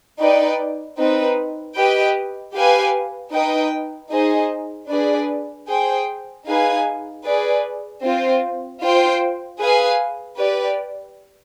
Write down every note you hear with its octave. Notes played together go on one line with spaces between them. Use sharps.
D#4 B4 D5 G5
C4 D#4 B4
G4 B4 D#5 G5
G4 B4 F5 G#5
D#4 B4 D#5 G5
D#4 G#4 C5 D#5
D4 G#4 B4 D5
G#4 C5 G5
D#4 G#4 B4 F5 G#5
G#4 B4 D5
C4 F4 C5
F4 C5 G5
G#4 B4 F5 G#5
G4 B4 D5